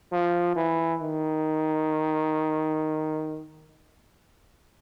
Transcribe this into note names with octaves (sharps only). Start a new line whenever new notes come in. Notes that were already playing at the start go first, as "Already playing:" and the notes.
F3
E3
D#3